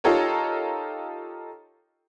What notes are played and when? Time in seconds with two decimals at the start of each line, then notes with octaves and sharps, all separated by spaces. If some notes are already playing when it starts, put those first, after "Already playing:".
0.04 D#4 F4 G4 A4 A#4 C#5